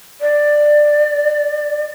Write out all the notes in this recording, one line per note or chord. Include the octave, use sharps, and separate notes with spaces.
D5